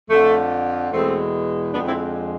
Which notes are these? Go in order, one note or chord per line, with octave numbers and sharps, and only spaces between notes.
F2 D3 F3 A3
E2 B2 G#3 A3 C4
F2 D3 G#3 B3 D4
C4 E4